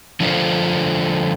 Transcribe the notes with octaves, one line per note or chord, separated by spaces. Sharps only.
D3 F3 A3 D4 F4 C5